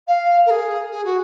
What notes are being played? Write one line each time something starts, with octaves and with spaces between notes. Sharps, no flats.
F5
A#4
G#4
G#4
F#4